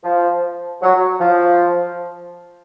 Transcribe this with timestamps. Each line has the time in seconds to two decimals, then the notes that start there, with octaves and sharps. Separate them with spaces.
0.04 F3
0.82 F#3
1.20 F3